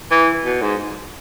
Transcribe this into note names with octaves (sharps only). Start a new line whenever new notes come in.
E3
B2
G#2